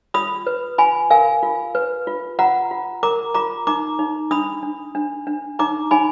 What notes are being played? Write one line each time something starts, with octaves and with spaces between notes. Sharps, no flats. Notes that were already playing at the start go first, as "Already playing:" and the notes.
F4 B5 D#6
B4
F4 G#5 B5
A#4 F5 G#5
F4
B4
F4
F4 F#5 A#5
F4
A#4 A#5 D6
F4 A#5 D6
D#4 A#5 D6
D#4
D4 B5 D#6
D4
D4
D4
D#4 A#5 D6
D#4 G#5 B5